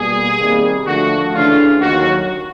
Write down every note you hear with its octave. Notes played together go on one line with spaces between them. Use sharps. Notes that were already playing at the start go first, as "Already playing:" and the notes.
Already playing: B2 G3 A#3 G#4
C3 D#3 G3 A#3
D3 F3 A3 F#4
C#3 E3 A3 D4 F4
D#2 D#3 F#3 F#4